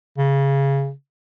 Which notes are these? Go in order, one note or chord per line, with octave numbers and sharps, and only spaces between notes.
C#3